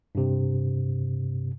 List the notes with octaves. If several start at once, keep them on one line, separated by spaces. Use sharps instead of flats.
G2 C3